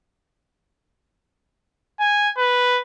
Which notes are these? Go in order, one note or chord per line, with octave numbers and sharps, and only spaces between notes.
G#5
B4